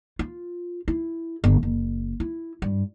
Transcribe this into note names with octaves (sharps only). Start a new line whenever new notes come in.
F4
E4
G1
F#1
E4
G2